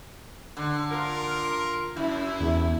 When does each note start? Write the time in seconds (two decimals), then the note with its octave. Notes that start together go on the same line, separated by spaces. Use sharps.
0.57 D3
0.91 F4 A#4
1.97 F#2 E4
2.40 E2